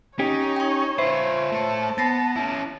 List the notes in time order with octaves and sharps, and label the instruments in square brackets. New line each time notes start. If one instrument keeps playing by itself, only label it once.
[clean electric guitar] C#4 G4 [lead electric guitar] D#4 [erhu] C#5
[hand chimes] G5 C#6
[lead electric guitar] F4 B4 [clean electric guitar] C5 [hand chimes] E5
[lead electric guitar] A3 C#5 [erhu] A5
[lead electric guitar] B3 [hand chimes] A6 A#6 C7
[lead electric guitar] C#4 E4